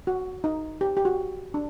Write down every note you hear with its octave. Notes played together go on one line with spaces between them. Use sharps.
F#4
D#4
G4
G4
F#4
D4